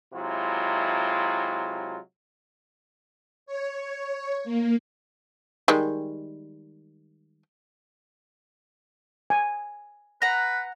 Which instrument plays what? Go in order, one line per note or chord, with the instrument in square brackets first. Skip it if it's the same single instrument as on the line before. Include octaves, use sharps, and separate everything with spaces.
[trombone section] C3 F#3 G#3 E4 F4
[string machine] C#5
A#3
[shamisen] D#3 G3 G#3
[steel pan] G#5
[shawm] B4 [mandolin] F#5 A#5